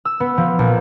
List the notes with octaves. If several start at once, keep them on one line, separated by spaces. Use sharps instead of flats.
E6
B3
F3
A#1